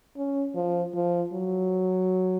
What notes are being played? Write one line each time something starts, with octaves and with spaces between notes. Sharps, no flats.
C#4
F3
F3
F#3